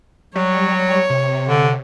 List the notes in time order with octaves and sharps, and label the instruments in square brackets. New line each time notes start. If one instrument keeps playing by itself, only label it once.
[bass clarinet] F#3 [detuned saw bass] G3 [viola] C#5
[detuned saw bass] C3
[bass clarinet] D3